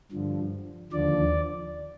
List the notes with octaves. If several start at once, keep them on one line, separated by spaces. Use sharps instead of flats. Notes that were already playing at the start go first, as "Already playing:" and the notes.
G2 D3 F3
D#2 D3 F3 D5